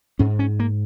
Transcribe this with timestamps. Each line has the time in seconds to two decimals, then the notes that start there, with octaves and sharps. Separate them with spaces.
0.19 G#2 C#4
0.39 C#4
0.60 A#3